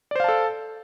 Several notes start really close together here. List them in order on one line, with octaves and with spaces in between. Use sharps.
D5 C5 F5 A5 A4